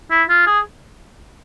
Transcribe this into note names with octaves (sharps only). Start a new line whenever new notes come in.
E4
F4
G#4